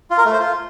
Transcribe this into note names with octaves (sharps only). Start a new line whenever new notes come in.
F4
A#4
A3
C5
F4